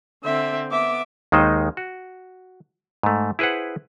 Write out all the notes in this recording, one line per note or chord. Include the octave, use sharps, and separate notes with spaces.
D3 C4 E5
B3 E5 D6
D#2 D#3 G#3 D#4 C5 D#5
F#4
G#2 A3
E4 G#4 B4 C5 F#5